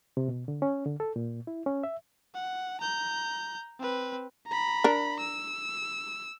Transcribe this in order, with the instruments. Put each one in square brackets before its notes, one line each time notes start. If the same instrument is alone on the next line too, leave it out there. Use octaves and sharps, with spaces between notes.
[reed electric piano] C3
B2
D3
C#4
D3
A4
A#2
E4
C#4
E5
[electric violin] F#5
A#5 G6
C4 B4
A#5 B5
[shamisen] D4 A#4
[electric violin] E6